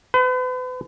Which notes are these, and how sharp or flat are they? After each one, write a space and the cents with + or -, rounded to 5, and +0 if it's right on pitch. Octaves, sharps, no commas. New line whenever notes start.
B4 +40